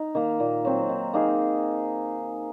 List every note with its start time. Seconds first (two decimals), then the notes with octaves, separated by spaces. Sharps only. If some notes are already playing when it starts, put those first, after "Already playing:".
Already playing: D#4
0.15 D#3 A#3
0.40 A#2
0.65 F#3 C4
0.89 D#3
1.14 A#3 D#4 G#4